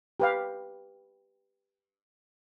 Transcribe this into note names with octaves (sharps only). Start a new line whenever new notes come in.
G4 B4 F5